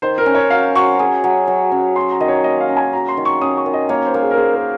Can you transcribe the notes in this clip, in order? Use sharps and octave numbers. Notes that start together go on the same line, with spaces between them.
D#3 C5
A#4
C#4
C#5
F#3 F5
F#3 C#6
G#4
F#3
F#3
C#4
F#4 C6
A#5
D#3 D#5
C#5
A#3 D#5
F5
C#4
G#5
F#4 A#5
C6
D#3
C#6
C#4 D#6
C#6
D#3
D#5
A#3 C#5
C5
A#3
G#4
A#4
G#4 C5
A#4